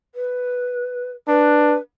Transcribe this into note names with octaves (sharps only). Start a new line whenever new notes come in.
B4
D4 B4